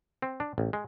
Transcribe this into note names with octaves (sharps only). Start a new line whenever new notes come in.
C4
D4
A1
G#3